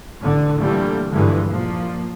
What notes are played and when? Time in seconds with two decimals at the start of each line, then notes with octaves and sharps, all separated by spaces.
0.21 A1 D3
0.59 A#2 D3 E3 G3 A3 A#3
1.11 G2 D3 E3 F3 G3 G#3
1.48 A#2 F3 A#3